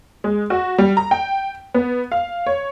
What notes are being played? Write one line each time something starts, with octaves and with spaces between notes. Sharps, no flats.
G#3
F#4
G3
A#5
G5
B3
F5
C#5